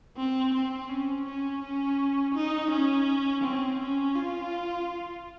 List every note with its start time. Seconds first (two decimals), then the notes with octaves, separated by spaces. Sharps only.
0.17 C4
0.54 C4
0.89 C#4
1.25 C#4
1.62 C#4
2.34 D#4
2.70 C#4
3.43 C4
3.79 C#4
4.15 F4